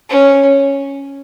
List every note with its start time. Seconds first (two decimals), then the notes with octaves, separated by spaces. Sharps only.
0.10 C#4